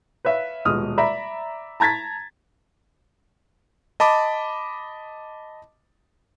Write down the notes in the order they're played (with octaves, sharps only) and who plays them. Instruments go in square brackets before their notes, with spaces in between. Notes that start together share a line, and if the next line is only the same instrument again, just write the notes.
[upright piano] B4 C#5 E5 F5
D#1 B2 G#3 D#6 F6
D5 E5 A#5 B5
A5 A#5 G#6 A6 B6
[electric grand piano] D#5 A5 B5 D6